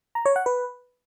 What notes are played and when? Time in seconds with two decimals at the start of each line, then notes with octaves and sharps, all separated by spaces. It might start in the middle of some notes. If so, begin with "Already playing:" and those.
0.15 A#5
0.26 C#5
0.36 F#5
0.46 B4